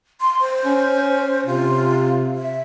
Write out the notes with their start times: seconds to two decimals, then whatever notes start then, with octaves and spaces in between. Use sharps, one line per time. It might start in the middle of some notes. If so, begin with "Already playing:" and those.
0.21 C6
0.40 C5
0.65 C#4
1.46 C3 F4
2.35 E5